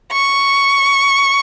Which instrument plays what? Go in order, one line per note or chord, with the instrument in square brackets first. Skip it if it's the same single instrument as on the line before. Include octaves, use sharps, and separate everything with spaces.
[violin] C#6